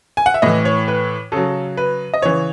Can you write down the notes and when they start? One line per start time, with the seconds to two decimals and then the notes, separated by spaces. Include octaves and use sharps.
0.17 G#5
0.26 F#5
0.34 E5
0.42 A2 E3 D#5
0.65 C#5
0.88 B4
1.32 C#3 F#3 A4
1.77 B4
2.14 D#5
2.22 C#3 E3 C#5